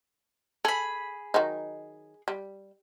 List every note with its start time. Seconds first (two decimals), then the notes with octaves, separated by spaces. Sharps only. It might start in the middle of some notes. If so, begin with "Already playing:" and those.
0.65 G#4 A4 B5
1.34 D#3 F#3 D#4
2.28 G3